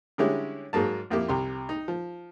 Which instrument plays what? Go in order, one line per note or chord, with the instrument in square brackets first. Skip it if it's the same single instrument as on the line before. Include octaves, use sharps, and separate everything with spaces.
[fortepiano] D3 G3 G#3 C#4 E4 G4
G#2 F#3 G#3 A#3 A5
F2 A#3 E4 G4
C2 C3 C6
D#4
F3